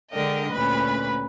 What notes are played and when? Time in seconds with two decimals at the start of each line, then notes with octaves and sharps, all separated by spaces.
0.11 D3 G#3 D4 A#4 D#5 G5
0.51 D2 A#2 C#4 B4 B5